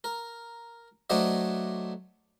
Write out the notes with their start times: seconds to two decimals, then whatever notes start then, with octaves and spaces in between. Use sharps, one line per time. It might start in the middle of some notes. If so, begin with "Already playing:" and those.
0.04 A#4
1.10 F#3 A3 D4 C5 D#5